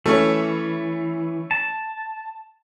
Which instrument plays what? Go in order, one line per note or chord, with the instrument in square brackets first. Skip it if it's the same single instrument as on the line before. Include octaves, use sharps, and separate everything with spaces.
[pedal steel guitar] E3 [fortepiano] A3 C#4
[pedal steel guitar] A5